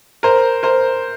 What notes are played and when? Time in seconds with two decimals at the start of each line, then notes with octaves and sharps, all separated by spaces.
0.23 A#4 C5
0.63 A#4 C5